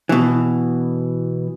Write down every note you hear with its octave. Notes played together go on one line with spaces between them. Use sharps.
B2 E3